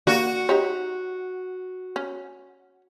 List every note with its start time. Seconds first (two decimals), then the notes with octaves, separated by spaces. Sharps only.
0.07 A#3 F#4 G4 D5
0.49 D#4 G4 C#5
1.96 C#4